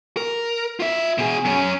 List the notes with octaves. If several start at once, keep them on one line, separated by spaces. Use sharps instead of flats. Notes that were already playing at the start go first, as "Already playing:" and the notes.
A#4
F4 E5
B2 G#4
F#2 C#4